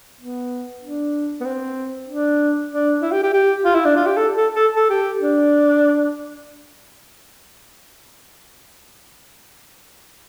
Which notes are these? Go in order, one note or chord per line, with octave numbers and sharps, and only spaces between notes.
B3
D4
B3
C4
D4
D4
E4
G4
G4
G4
F4
E4
D4
F4
G4
A4
A4
A4
A4
G4
D4